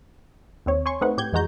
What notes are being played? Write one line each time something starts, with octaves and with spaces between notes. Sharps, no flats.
D#2 C4 C#5
C#5 G#5 C6 C#6
A3 C4 D#4 B4 F#5
A2 G4 G6 G#6
F2 E3 G#3 F#4 A#5 G6